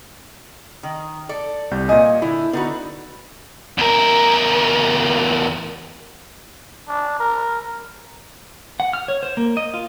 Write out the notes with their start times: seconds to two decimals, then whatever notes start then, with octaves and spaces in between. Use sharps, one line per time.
0.83 D#3
1.29 A4 D5
1.71 C2 G3 G6
1.89 A#2 D#5 G#5
2.22 D3 E4
2.53 D3 B3 D#4 F#4 B4
3.78 E2 A#4
6.88 D4
7.20 A#4
8.80 F#5
8.93 F6
9.08 C#5
9.23 C5
9.37 A#3
9.57 D#5
9.74 F4